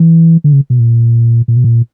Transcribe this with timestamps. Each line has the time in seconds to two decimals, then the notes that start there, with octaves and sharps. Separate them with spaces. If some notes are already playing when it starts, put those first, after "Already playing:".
Already playing: E3
0.44 D3
0.53 C#3
0.70 B2
0.79 A#2
1.48 A#2
1.56 B2
1.64 A#2